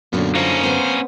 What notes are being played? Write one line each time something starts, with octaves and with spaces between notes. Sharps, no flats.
F#2 A#2 D3 F#3 B3 C#4
A#3 C#4 D#4 F4 C5 A5
B3 C4 C5